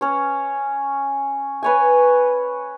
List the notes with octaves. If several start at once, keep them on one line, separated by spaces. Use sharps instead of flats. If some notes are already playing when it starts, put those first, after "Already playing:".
C#4 C#5
B4 C#5 G#5